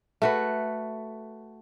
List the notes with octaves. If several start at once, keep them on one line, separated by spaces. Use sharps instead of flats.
A3 F#4 B4